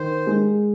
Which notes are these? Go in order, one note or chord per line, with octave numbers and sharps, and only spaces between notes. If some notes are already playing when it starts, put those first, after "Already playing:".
Already playing: D#3 C5
G#3